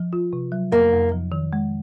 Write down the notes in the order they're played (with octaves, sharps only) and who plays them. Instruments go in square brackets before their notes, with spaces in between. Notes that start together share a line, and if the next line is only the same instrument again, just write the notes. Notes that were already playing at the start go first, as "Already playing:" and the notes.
Already playing: [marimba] F3
F4
C3
F#3
[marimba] F2 [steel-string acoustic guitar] A#3
[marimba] F2
F3
D#3
G#3